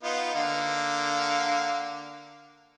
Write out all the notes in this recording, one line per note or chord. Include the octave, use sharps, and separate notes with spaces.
B3 D#4 F4
D3 A#3 F5